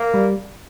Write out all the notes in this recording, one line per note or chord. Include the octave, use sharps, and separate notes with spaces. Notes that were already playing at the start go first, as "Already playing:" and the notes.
Already playing: A#3
G3